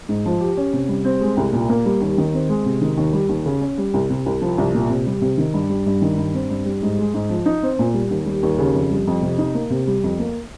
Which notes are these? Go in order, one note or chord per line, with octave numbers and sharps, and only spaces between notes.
G#2
F3
G4
C#4
C3
G3
C4
G#3
C2
A#2
A#3
G3
D#2
D#3
C4
G#3
C3
D#3
D#2
G3
D#2
C#3
C#4
G3
C2
C3
C2
F3
C2
A#2
C3
G3
C3
D#3
G2
G3
G2
D#3
G2
C4
G2
G3
G#2
G#3
G#2
F3
D#4
C4
A#2
G3
D#2
G3
D#2
C#3
F2
G3
F2
C3
D#4
A#3
C3
G3
F2
A#3